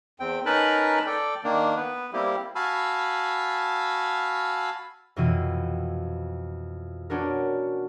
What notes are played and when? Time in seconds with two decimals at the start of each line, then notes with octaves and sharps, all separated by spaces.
0.20 E2 C4 G5
0.46 C#4 D#4 A#4 B4 A5 B5
1.06 A4 D5 G5
1.44 D#3 A#3 D4
1.76 B3 B4
2.13 G3 A#3 C4 E4 G4
2.55 F#4 F5 G#5 A5 B5 E6
5.16 F2 B2 E3 C4 E4 D#7
7.10 B3 C#4 D4 F#4 A#4